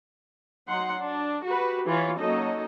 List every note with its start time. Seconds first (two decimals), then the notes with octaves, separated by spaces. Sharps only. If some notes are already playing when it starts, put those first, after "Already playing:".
0.68 F#3 D#4 F#5 C6
0.98 D4
1.44 F#4 G4 B4
1.87 E3 F4 C#5
2.18 F#3 A#3 C#4 D#4 A4 D#5